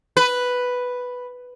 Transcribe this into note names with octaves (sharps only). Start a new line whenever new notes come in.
B4